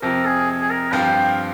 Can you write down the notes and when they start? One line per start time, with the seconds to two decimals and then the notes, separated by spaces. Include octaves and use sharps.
0.02 F2 C3 F3 A#4
0.25 G#4
0.61 G#4
0.70 A#4
0.93 G2 F3 C4 F4 G5